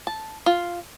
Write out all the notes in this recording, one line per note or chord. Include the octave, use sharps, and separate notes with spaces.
A5
F4